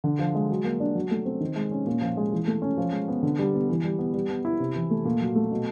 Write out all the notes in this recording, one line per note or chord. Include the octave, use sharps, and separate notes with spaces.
D3
F3
G#3
F#3
A#3
D4
F#3
A3
C4
D#3
G#3
C#4
A#2
F3
G#3
E3
A3
C#4
F3
G#3
B3
D3
G3
B3
E3
G3
B3
G3
B3
E4
C3
E3
A3
A#2
F#3
A3
B2